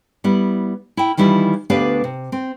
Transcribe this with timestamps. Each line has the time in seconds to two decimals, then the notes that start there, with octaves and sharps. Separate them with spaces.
0.24 G3 B3 E4
0.97 E4 G5
1.17 D#3 E3 G3 E4 F4
1.70 D2 B3 D4 G4 B4 F5
2.04 C3
2.32 C4